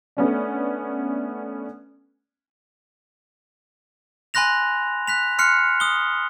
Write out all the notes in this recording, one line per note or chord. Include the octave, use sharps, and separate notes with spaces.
A3 B3 C#4 D4
G#5 B5 C6 F#6 A#6 F7
F#6 B6 F7
C6 F6 F#6 C7 C#7
D#6 G7